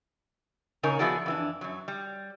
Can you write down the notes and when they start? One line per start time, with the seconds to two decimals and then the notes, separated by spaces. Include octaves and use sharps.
0.83 A#2 C#3 D#4 A#4 C#5 G#5
0.99 F3 B3 E4 F#4 G#4 D5
1.26 F2 E3 D4
1.61 F#2 F#3
1.88 G3